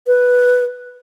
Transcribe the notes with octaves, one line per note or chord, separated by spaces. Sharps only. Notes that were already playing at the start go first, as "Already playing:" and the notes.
B4